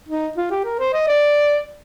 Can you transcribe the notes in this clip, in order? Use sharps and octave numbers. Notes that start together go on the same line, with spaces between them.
D#4
F4
G4
A#4
C5
D#5
D5